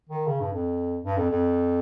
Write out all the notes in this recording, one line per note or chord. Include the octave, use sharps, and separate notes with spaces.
D#3
C#3
G2
F2
G2
F2
F2